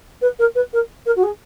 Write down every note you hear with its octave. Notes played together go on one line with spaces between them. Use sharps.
B4
A#4
B4
A#4
A#4
F#4
G#4